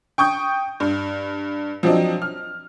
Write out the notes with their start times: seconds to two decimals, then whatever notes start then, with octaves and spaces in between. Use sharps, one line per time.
0.18 G5 C#6 D#6 G6
0.80 G2
1.83 F3 F#3 C4 D4 D#5
2.22 F6